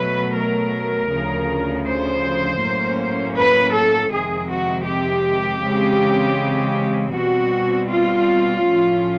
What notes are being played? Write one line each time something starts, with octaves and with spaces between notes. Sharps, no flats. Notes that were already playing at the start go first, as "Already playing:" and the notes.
Already playing: B2 F#3 A3 B4
A#4
D2 C#3 F3
C5
A2 F#3 A#3 C#4
B4
A4
F2 C3 D#3 G#3 C4 G#4
F#4
G4
C#3 E3 G#3 C4
B2 G3 C4 F#4
F4
A2 F3 A3 C#4